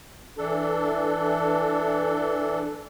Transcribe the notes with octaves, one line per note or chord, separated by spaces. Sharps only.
E3 D4 A4